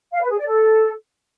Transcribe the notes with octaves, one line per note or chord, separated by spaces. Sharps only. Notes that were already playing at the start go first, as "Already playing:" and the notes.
F5
B4
G#4
D5
A4